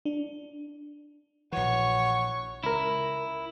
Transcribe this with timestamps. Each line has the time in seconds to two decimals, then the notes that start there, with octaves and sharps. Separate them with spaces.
0.05 D4
1.52 A#1 E3 F#4 C#5 C#6
2.63 C#2 E4 A#4